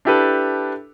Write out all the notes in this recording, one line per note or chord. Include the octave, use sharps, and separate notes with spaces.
D4 E4 G4 A4 B4